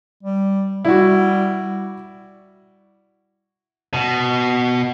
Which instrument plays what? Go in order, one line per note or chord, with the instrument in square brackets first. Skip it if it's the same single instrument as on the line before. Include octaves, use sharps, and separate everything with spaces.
[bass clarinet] G3
[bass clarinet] G3 [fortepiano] E4 F#4
[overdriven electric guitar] B2